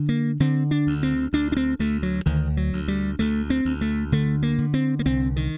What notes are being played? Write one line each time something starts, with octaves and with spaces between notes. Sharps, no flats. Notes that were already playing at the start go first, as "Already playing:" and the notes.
Already playing: D3
A#3
D3 C4
D4
D2
C4
D2 D4
D4
C4
D2 A3
F#3
D2 D#3
F#3
D2
G3
D2 A3
C4
D2
A3
D3 A3
A#3
D3
C4
A#3
C2 C4
D#3